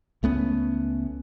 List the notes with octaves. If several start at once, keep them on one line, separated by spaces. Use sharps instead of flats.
C#2 A3 B3 C#4